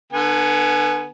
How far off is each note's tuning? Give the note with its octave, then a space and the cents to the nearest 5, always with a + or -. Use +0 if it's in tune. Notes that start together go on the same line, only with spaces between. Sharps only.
D3 +35 B3 +0 G#5 +20